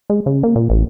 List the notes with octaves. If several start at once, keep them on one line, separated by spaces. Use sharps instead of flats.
G#3
C#3
A#3
A#2
A1